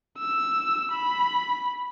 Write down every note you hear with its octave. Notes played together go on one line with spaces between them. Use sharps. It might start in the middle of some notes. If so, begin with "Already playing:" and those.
E6
B5